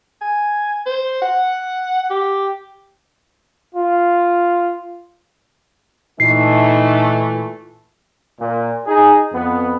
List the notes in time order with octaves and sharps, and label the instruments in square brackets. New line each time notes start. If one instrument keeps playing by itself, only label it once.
[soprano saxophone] G#5
C5
F#5
G4
[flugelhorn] F4
[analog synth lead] A#2 [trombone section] E3 A3 [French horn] D#4 [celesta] C7
[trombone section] A#2
D#4 G#4
F2 B3